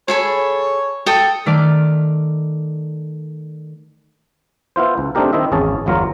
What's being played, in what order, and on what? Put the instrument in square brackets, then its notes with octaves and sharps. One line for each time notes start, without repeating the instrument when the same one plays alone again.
[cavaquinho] G#4 A4 B5 [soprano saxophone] C#5
[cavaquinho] A4 G5 D#6
[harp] D#3 A3 D5 F6 D7
[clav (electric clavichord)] B3 E4 F4 C5
C#2
A3 C4 D4 D#4 G4 A#4
D#3 C4 E4 D#5 E5
G#1 E2 C#4 G#4 A5
G1 E2 F#3 F4 A#4 A#5